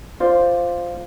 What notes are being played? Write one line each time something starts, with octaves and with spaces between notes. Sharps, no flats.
F4 C5 D5